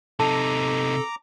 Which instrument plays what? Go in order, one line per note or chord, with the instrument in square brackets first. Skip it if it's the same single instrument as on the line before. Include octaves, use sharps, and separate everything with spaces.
[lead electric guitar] C3 D#4 [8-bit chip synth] A4 [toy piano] A5 [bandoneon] A#5 D6